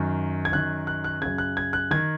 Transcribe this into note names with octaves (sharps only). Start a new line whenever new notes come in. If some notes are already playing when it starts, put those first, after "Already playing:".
Already playing: F#2 D#3
G#6
F#2 D#3 F#6
F#6
F#6
F#2 C#3 G#6
F#6
G#6
F#6
D#3 G#6